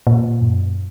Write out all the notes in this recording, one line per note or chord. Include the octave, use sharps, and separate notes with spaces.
A#2
F#2